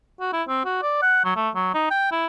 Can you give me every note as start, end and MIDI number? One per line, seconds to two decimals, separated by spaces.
0.20 0.31 66
0.33 0.43 64
0.48 0.63 60
0.65 0.79 66
0.82 0.99 74
1.02 1.21 78
1.24 1.32 54
1.36 1.49 57
1.55 1.71 54
1.74 1.90 63
1.91 2.10 79
2.12 2.26 64